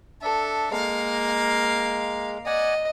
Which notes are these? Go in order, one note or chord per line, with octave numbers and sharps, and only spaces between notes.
D4 A4 E5
G#3 A#3 F5
D5 D#5 F#5 G#5